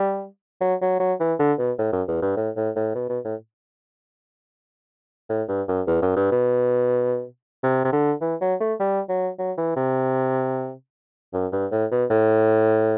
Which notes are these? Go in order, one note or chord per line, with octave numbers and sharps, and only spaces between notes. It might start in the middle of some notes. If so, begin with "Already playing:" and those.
Already playing: G3
F#3
F#3
F#3
E3
D3
B2
A2
F#2
E2
G2
A2
A2
A2
B2
B2
A2
A2
G2
F#2
E2
F#2
G2
B2
C3
C3
D3
E3
F#3
A3
G3
F#3
F#3
E3
C3
F#2
G2
A2
B2
A2